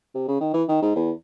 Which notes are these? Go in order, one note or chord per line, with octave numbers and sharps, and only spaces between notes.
C3
C#3
D#3
E3
D#3
G#2
E2